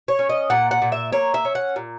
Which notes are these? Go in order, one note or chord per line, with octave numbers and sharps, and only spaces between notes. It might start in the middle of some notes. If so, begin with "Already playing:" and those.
C#5
C#4
D#5
A#2 F#5
F#5
A#2
E5
A#3 C#5
E5
C#4
F#5
A#2